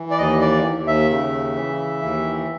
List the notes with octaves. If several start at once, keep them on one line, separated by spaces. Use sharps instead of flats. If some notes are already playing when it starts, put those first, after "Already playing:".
Already playing: E3
D5
D#2 D#5
D5
D#2
E5
C#3
E3
D#2